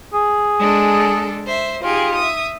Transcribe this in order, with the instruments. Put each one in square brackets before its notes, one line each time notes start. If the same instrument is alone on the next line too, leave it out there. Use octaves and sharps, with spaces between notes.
[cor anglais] G#4
[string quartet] G#3 D4 A4
C5 E5
[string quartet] D#4 G4 G#4 [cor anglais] F4
[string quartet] E5 D#6